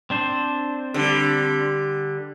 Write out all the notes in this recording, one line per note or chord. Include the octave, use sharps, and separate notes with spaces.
C4 D4 C5
D3 G3